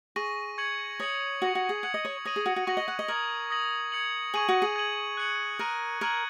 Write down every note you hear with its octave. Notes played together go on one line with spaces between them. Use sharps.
G#4 C#6 A#6 D#7
C#6 G#6 C#7 F#7
C#5 D#6 A#6 C#7 F#7
F#4 C#6 A#6 C#7 F#7
F#4
G#4
F#5 G#6 C#7 F#7
D#5
C#5
C#5 D#6 A#6 D#7 F#7
G#4
F#4
F#4
F#4 C#6 A#6 F#7
D#5
F#5
D#5
A#4 D#6 G#6 F#7
D#6 A#6 F#7
G#6 C#7 F#7
G#4 C#6 G#6 D#7 F#7
F#4
G#4
G#6 D#7 F#7
F#6 C#7 F#7
A#4 F#6 A#6 D#7
A#4 G#6 D#7 F#7